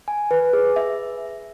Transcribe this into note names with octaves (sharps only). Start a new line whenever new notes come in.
G#5
B4
G#4
E5